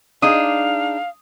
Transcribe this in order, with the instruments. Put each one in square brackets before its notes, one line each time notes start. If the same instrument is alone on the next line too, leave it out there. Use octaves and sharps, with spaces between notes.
[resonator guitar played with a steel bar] D4 D#4 G#4 [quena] F5 [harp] D#6 D#7